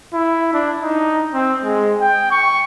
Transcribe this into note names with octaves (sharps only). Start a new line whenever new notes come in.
E4
D4
D#4
C4
G#3
G5
C#6